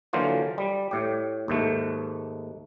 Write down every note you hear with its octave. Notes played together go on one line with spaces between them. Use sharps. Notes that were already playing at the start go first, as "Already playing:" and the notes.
D3 E3 F#3 A#3 F4 C5
G3
A2 G4
D#2 G#2 A3